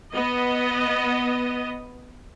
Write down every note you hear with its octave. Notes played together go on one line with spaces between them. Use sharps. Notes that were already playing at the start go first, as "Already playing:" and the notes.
B3 D#5